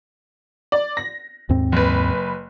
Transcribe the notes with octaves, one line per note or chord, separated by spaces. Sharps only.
D5
A#6
D#2 G#2 C4
F#1 B4